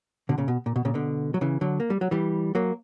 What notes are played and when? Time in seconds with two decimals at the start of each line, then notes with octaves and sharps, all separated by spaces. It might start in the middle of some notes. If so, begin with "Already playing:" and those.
0.29 B2 D3
0.38 A#2 C#3
0.48 B2
0.66 A#2
0.76 B2
0.85 A#2 C#3
0.94 B2 D3
1.34 F#3
1.41 C#3 E3
1.61 D3 F#3
1.80 A#3
1.90 G3
2.01 F#3
2.11 E3 G3
2.55 F#3 A#3